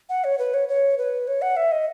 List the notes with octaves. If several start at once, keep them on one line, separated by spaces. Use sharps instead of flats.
F#5
C#5
B4
C#5
C#5
B4
C#5
F#5
E5
D#5